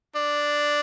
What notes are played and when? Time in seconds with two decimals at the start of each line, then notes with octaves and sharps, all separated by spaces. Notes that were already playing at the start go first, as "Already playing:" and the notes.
0.16 D4